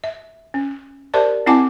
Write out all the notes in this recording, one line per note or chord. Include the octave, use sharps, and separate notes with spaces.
E5
C#4
G4 A#4 C5 D5 E5 A5
C4 E4 F#5 G#5 A5 D6